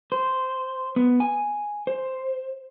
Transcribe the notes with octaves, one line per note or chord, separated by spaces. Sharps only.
C5
B3
G#5
C5